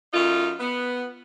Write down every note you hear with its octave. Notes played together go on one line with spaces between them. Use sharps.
F#2 A3 D#4 F4
B3